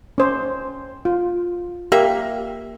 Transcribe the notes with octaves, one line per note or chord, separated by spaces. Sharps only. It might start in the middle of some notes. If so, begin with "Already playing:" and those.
C#4 C5
F4
A#3 G4 E5